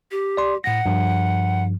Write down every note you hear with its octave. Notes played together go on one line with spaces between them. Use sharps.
G4
D5 C6
A2 F#5 A#6
G2 F3